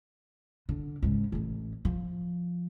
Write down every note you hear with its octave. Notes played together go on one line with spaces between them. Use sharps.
D3
G#2 C#3
A1 E3
F3